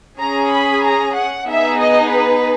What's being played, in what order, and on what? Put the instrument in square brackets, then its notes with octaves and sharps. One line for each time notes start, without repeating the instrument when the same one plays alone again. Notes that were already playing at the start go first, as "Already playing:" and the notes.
[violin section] C#4 G#4 A#5
B5
A#5
F#5
B3 D#4 G#4 E5
D#5
B4